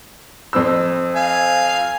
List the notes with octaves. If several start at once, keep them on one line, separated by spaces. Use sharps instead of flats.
F2 C4 E6
F5 G#5